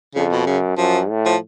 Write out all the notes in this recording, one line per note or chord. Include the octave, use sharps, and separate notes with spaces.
F2 C#3
B2
F#2 C#3
F#2 F3
A2
F3